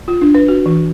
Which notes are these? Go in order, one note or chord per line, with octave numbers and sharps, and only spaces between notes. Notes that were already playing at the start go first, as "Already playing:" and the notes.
F4
D4
B4
F#4
E3